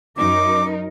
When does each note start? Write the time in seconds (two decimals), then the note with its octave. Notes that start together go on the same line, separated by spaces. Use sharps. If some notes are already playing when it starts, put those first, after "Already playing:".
0.17 F#2 D#4 A#4 D6